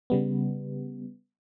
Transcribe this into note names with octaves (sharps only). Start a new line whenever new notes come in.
C#3 G3 B3